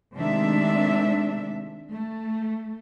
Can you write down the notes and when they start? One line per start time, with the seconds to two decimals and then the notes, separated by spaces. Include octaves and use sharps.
0.17 C3 D#3 G#3 A3 D4 E5
1.92 A3